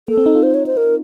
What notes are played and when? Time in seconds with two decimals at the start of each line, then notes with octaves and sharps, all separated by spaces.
0.08 A#3 A4
0.17 C4
0.26 D#4
0.35 F4
0.43 C5
0.54 C#5
0.66 C5
0.77 A#4